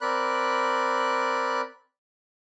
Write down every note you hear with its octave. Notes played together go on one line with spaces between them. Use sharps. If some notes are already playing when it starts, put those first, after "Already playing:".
C4 A#4 D5 B5 F#6